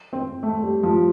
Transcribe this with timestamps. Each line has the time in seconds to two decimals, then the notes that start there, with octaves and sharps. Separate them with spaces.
0.13 C4
0.43 A3
0.62 G3
0.83 F3